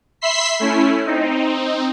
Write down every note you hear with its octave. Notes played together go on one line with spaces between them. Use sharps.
E5 B5 C6 E6 B6 C7
A3 C#4 E4
C4 D#4